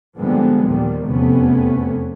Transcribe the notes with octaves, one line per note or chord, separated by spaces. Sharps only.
G#2 D3 F3 G3 G#3 B3
D#2 A#2 D#3 F3 G3
F1 E2 C3 A3 B3 C#4